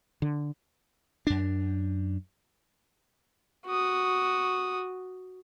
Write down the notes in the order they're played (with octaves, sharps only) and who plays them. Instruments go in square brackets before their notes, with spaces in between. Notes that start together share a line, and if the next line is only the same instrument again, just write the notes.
[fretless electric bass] D3
[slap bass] F#2 D4
[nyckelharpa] F#4 D#6